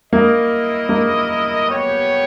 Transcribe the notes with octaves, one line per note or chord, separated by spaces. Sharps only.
A#3 E4 A#4 D#5
A#3
B3 G4 C#5 G5